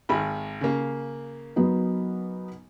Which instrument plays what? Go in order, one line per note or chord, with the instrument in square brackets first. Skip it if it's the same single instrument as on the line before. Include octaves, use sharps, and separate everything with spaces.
[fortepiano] G#1 D#3 B5
C#3 A#3
[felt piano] F#3 B3 D#4